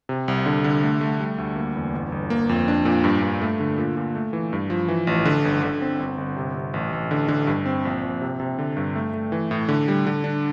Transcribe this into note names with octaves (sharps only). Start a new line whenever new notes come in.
C3
C2
D3
D3
A3
A3
G3
D2
A#3
E2
G1
G1
A#3
F2
D4
A#2
G2
G2
A3
D3
A#2
A#2
A3
E3
G2
F3
E3
A1
D3
G1
D3
C4
G1
G1
C3
C3
A1
A1
D3
D3
G2
C4
A#1
A#1
C3
C3
D3
G2
A3
A3
E3
A2
D3
G3
D3
D4